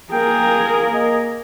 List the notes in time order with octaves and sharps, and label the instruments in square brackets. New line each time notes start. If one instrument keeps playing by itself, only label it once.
[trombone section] A#3 [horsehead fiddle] G#4 A#4 [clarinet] G5
[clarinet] D#5